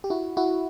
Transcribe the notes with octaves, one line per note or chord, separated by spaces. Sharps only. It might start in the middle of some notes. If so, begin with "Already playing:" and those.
G4
E4 F#4
E4 F#4